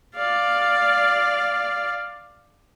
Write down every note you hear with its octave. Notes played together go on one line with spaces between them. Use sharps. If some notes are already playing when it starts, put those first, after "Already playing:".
D5 F5